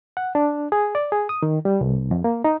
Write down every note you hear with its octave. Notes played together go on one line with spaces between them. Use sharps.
F#5
D4
G#4
D5
G#4
D#6
D#3
G3
C2
F2
A#3
D#4